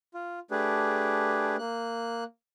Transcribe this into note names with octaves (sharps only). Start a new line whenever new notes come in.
F4
A3 D4 G4 G#4 B4
A#3 F#6